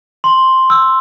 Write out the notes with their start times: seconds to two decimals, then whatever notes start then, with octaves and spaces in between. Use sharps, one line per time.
0.24 C6
0.70 E6